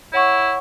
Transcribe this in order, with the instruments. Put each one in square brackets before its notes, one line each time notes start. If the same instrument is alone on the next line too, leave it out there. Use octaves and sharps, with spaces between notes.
[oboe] E4 [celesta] C#5 F#5 C#6